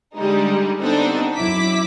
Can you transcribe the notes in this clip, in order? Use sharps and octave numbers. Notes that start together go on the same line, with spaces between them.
D3 G3 G#3 D#4
B3 C4 D4 D#4 A4
F#2 E4 D6 B6